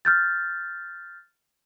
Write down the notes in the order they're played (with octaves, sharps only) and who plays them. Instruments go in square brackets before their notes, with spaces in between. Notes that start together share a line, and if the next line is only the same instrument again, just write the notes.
[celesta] F6 G6 A6